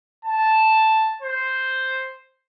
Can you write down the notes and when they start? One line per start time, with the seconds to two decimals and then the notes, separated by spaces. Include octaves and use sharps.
0.25 A5
1.22 C5